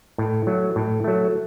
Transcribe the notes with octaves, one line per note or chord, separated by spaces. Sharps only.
A2
F#3 A3
A2
F#3 A3